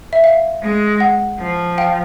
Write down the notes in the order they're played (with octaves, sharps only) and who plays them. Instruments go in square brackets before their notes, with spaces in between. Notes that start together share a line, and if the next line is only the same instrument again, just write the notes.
[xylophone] E5
F5
[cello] G#3
[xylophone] F#5
[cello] F3
[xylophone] F5 G5